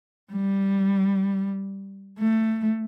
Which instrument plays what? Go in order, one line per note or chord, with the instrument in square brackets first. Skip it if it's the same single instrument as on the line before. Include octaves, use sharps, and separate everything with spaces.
[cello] G3
A3